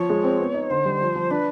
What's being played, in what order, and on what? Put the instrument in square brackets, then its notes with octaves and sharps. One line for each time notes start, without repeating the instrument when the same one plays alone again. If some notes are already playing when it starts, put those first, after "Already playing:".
Already playing: [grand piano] F3 [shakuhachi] C#5
[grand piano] G#3
C4
B3
D#4
[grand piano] D3 [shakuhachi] C5
[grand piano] G3
F3
F3
[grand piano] D4 [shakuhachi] B4